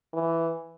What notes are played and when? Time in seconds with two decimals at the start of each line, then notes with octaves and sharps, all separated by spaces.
0.13 E3